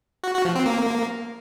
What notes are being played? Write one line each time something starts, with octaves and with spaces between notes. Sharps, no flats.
F#4
F#4
F3
C4
A#3